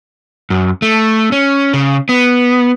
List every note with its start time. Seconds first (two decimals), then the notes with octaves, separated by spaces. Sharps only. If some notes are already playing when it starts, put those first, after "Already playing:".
0.50 F#2
0.82 A3
1.32 C#4
1.73 C#3
2.09 B3